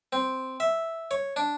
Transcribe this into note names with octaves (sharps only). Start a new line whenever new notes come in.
C4
E5
C#5
D4